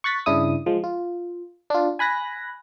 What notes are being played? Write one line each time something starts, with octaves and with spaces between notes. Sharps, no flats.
C#6 F#6 A6 B6
G2 C#3 D4 E4 D#6
F3 G#3
F4
D4 F4
G#5 B5 F#6 A#6